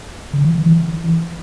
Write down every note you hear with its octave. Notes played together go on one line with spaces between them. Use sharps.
D3
E3
E3
E3